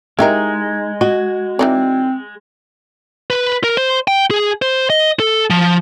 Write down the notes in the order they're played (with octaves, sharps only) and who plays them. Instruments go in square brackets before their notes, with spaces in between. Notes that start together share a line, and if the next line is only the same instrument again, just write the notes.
[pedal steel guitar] G#3 [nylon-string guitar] D#4 G#4 [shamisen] E4 G4 A#4
[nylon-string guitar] F#4 [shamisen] D#5
[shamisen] E3 D#4 D5 [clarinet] C4
[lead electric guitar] B4
A#4
C5
G5
G#4
C5
D#5
A4
F3